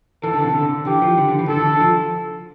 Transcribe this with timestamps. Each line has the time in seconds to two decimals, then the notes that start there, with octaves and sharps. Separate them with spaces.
0.23 E3 A4
0.34 D3
0.44 C3
0.54 D3
0.86 E3 G4
1.02 F3
1.17 D3
1.29 D3
1.39 E3
1.48 D3 A4
1.60 D3
1.70 D3
1.80 F3